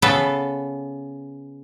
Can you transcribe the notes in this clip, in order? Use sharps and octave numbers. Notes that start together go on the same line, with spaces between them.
C#3 B3 A4 B4